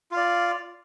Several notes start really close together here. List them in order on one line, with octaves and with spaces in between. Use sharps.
F4 F5 D5